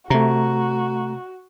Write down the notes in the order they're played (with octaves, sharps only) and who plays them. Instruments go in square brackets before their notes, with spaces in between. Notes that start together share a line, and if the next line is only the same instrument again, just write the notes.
[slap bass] C3 [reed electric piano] A3 A#5 [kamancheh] F#4